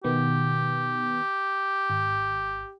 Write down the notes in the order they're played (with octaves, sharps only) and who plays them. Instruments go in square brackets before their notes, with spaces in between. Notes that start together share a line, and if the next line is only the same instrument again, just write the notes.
[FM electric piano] B2 D#3 B3 [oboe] G4
[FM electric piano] G#1